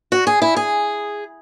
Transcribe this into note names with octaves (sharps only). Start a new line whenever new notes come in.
F#4
G#4
E4
G#4